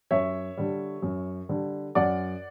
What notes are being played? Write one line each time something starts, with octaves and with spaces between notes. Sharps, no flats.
F#2 C#5 E5
D3 G3
F#2
D3 G3
F#2 D5 F#5